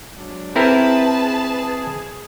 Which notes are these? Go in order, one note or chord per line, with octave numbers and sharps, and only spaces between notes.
F#3 G#3 D4
C4 E4 G#4 A#4 B4 A5